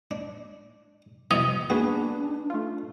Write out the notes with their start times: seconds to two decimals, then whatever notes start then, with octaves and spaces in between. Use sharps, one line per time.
0.11 D4
1.31 C2 F2 B2 E3 F#3 E5 D#6
1.70 D#2 B3 D4 F#4 G#4 B4
2.50 A3 F4